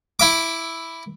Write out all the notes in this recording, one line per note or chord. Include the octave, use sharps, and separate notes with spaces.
E4 E5 D6